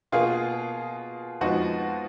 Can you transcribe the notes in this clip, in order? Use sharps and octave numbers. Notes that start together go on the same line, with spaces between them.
B2 A#3 F4 G#4
F2 F3 G#3 B3 D#4 F#4